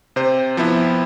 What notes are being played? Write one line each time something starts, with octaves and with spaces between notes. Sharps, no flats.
C3 C5
F3 B3 E4